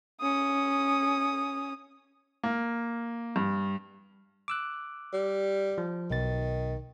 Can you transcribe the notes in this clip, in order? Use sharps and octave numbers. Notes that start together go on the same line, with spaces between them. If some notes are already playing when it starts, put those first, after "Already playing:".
C#4 D#6
A#3
G2
D6 E6 F#6
G3
F3
B1 B2 D#3 A6